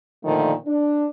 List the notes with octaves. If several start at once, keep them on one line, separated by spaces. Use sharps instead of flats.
A#2 D3 D#3 F3 A3
D4